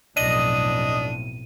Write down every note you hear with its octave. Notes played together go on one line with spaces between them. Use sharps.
B1 F2 A2 D4 D#5 D#7